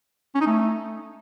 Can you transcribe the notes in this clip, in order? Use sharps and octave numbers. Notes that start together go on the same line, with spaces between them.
C#4
D#4
A3